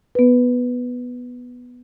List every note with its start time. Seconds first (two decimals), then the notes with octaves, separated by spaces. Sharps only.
0.15 B3 B4